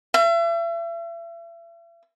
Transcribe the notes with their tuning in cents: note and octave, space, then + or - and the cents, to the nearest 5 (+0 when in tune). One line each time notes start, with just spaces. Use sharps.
E5 +40